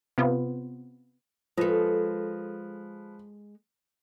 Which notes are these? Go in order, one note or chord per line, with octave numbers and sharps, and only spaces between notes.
C3 B3 F4
F3 G#3 A4 B4